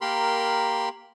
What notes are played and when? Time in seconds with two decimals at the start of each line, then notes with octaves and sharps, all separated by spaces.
0.01 A#3 G4 A#4 B5 C6